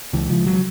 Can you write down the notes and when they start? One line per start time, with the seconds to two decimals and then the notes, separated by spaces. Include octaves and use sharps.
0.13 C#2 E3
0.30 C#2 F3
0.47 F#3